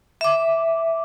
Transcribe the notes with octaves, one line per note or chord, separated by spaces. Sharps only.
E5 D6